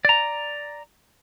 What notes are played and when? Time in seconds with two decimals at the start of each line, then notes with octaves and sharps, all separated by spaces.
0.05 D5 A#5